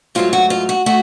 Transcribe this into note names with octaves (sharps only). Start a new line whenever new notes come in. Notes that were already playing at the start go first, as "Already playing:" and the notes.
G#2 F#3 A3 F4
F#4
F4
F#4
A3 F#4